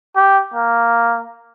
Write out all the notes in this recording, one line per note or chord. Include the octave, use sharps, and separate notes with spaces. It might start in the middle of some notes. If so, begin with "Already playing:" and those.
G4
A#3